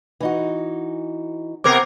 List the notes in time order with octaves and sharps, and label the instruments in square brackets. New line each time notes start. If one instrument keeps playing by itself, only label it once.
[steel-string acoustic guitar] E3 D#4 F#4
[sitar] C3 B3 A#4 [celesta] D6 G#6 C7